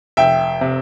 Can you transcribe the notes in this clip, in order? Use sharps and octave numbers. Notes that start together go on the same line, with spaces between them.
F1 E5 G5
C3